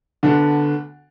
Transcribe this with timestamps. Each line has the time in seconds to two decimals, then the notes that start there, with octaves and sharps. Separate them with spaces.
0.23 D2 D3 B3 D4 A4